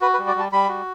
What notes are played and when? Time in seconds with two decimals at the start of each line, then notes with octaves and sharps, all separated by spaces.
0.01 F#4 B4
0.14 B4
0.19 G3
0.27 D5
0.35 G3 A5
0.52 G3 B5
0.69 F#4